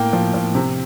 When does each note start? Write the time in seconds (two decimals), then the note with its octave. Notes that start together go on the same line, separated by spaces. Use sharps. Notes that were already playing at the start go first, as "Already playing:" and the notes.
Already playing: A2 A#3 G5
0.13 F3
0.34 F3
0.55 C3